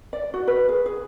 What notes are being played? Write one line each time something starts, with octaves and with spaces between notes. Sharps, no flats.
D5
F#4
B4
G#4
G#4